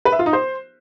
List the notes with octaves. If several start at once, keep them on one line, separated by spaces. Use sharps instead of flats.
B4
E5
F4
D#4
C5